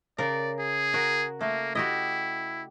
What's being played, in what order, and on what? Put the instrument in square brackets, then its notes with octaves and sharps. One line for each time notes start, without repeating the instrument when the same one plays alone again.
[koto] C#3 A#4 [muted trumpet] D5
[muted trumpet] G#4
[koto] F#4 A#4
[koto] A3 [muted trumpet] A#3
[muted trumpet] E4 [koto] F#4 G4 D#5